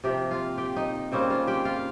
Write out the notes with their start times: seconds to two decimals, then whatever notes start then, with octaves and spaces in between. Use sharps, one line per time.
0.04 C3 F3 A#3 G4 G5
0.31 F4 F5
0.58 G4 G5
0.76 D#4 D#5
1.12 C#3 G3 A#3 C4 C#4 C5
1.30 F4 F5
1.47 G4 G5
1.65 F4 F5